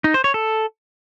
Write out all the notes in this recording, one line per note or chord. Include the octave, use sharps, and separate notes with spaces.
D#4
C5
C#5
A4